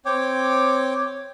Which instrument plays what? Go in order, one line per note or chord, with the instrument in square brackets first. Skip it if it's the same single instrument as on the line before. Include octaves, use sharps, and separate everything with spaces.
[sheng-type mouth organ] C4 C#5 G5 D6